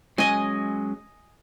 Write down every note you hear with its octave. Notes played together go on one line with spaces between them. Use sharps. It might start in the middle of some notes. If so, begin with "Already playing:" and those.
F#3 G#3 C#4 D#5 G#5